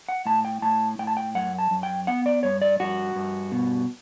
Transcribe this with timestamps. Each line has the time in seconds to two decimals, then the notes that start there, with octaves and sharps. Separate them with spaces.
0.08 F#5
0.26 A2 A5
0.45 G5
0.62 A2 A5
0.99 A2 G5
1.07 A5
1.17 G5
1.35 F#2 F#5
1.58 A5
1.71 F#2
1.83 G5
2.07 B3 F#5
2.26 D5
2.43 G2 C#5
2.62 D5
2.80 G2 F#4
3.16 G2
3.52 B2